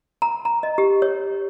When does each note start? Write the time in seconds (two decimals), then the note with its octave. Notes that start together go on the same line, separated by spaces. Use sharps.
0.22 A#5
0.45 A#5
0.63 D#5
0.78 G4
1.02 C#5